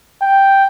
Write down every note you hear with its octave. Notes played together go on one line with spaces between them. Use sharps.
G5